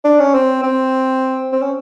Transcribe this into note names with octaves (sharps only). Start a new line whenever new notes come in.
D4
C#4
C4
C4
C4
C#4